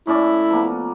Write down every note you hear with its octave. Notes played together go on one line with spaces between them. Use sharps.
A2 C#4 E4 D5
F3 A#3 B3